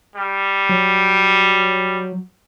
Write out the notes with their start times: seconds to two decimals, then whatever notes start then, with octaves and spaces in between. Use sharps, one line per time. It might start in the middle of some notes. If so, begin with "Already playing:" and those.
0.16 G3
0.69 F#3